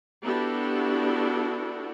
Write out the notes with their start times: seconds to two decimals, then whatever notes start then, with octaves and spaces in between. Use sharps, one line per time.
0.24 B3 D4 E4 F#4 G4 A4